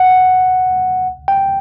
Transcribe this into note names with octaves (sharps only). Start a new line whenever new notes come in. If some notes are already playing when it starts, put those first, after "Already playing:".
Already playing: F#5
G5